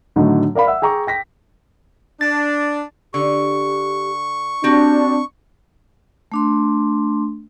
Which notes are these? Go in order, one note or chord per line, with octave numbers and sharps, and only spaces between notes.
A2 D3 D#3 F#3 A3 D#4
A#4 D5 F5 B5
E5 F#5 E6
G#4 G5 A#5 C#6 D6
G5 A#6 B6
D4 A6
D3 G4 C#6
C4 D4 F#4 G4
A3 D4 C6